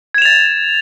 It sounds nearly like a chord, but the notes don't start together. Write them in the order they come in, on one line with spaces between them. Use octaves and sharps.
G#6 E7 F7 A6